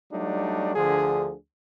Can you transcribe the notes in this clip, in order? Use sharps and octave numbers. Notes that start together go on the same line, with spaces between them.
F#3 G3 A3 D4 D#4
D2 D3 F3 G#4